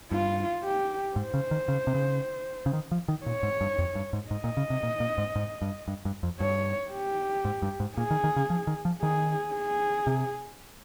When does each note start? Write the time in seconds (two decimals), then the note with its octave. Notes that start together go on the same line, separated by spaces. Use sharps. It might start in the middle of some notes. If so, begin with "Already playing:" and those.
0.11 G2 F4
0.64 G4
1.16 G#2 C5
1.34 C#3
1.51 D#3
1.68 C#3
1.87 C3
1.95 C#3
2.66 C#3
2.73 D#3
2.91 F3
3.08 D#3
3.26 A#2 C#5
3.43 G#2
3.61 G2
3.79 F2
3.95 G2
4.13 G#2
4.31 G#2 D#5
4.44 A#2
4.57 C#3
4.70 C3
4.83 A#2
5.00 A#2
5.18 G#2
5.36 G#2
5.62 G2
5.88 G2
6.05 G2
6.23 F2
6.40 G2 C#5
6.92 G4
7.45 G#2
7.62 G2
7.80 G#2
7.97 A#2 G#4
8.11 D#3
8.24 D#3
8.36 C#3
8.50 F3
8.67 D#3
8.85 F3
9.02 D#3 G#4
9.55 G#4
10.07 C3